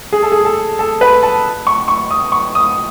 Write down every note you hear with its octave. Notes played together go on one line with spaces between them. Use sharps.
G#4
A4
G#4
A4
A4
B4
A5
C#6
C#6
D#6
C#6
D#6